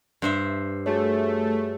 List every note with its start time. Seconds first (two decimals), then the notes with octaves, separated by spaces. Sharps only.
0.22 G2 C5 E5
0.86 A3 F#4 G#4 C#5